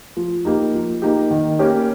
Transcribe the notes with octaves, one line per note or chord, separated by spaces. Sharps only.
F3
A#3 D#4 G4
F3
A#3 D#4 G4
D#3
A#3 C#4 G4